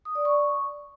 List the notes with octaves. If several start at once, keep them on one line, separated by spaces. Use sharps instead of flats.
D#6
D5
C#6